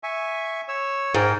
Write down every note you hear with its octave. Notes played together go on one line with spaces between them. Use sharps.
E5 G#5 C#6
C#5 E6
G#2 A#4 G5